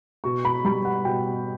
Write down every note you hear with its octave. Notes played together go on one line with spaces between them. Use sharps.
B2 C#6
B5
G3 B5
F#5
B2 G5